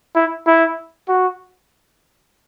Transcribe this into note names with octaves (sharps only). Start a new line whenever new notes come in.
E4
E4
F#4